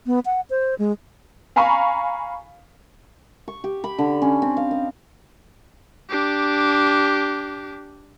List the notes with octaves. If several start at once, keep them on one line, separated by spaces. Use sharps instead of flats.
B3
F#5
C5
G#3
F5 G#5 A#5 B5 C#6
C#6
G4
B5
D3
C#4
C4
F5
D#5
D4 G4